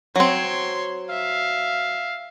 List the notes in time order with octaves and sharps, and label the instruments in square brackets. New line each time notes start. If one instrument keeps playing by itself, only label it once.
[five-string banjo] F#3 C4 [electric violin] C#5 C6
[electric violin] E5 [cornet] F5